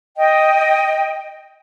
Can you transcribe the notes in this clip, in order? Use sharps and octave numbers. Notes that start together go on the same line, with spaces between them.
D#5 G5